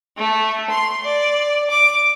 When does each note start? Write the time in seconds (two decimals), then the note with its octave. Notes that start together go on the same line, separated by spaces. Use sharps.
0.17 A3
0.70 C6
1.04 D5
1.70 D6